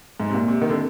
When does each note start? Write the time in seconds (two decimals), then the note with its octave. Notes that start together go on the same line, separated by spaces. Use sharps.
0.20 G#2
0.30 C3
0.34 A#2
0.48 C3
0.62 D#3
0.69 D3